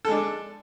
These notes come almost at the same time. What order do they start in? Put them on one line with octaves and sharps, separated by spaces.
A4 G#3 D4